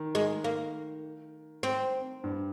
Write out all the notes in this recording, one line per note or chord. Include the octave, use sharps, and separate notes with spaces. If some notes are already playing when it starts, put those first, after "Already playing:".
Already playing: D#3
G#3
A#3
C4
G2